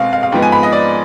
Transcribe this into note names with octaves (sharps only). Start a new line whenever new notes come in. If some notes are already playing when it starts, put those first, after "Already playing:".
Already playing: B2 G#3 C4 F5
F5
F5
G#2 F3 B3 G5
G#5
B5
D#5
D5